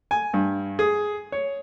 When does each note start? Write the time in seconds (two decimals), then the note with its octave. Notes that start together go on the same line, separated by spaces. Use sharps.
0.11 G#5
0.34 G2
0.79 G#4
1.32 C#5